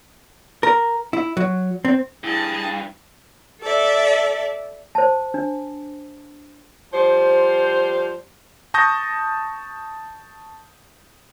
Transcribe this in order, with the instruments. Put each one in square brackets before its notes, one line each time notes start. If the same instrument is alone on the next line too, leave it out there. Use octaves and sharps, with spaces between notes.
[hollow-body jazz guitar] A#4
E4
F#3
C4
[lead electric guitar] G2 [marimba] E4 [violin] G#4 A5
[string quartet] A4 D5 E5
[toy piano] C5 A5
D4
[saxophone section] F3 G3 C5
[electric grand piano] A5 C#6 D#6 G6 A#6